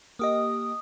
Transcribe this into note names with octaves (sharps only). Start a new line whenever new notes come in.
A#3 G4 D#5 D#6